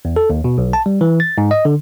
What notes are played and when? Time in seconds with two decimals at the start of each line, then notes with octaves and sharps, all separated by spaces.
0.05 E2
0.16 A4
0.30 D#2
0.44 B2
0.58 B1
0.73 A5
0.86 G3
1.01 E3
1.20 A6
1.38 G#2
1.51 D#5
1.65 D3